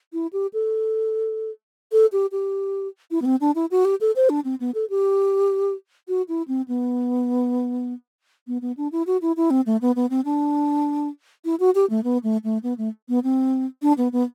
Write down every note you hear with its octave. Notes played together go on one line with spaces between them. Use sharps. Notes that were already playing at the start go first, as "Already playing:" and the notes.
E4
G4
A4
A4
G4
G4
E4
B3
C4
D4
E4
F#4
G4
A4
C5
D4
C4
B3
A4
G4
F#4
E4
C4
B3
B3
B3
D4
E4
F#4
E4
E4
C4
A3
B3
B3
C4
D4
E4
F#4
G4
A3
B3
A3
A3
B3
A3
B3
C4
D4
B3
B3